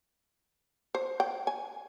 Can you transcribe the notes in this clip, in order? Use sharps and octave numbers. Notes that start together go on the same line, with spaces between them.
C5
G5
G#5